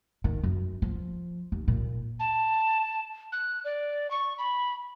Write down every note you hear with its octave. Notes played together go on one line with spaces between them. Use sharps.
D#3
F#2
F3
D#2
A#2
A5
F#6
D5
C#6
B5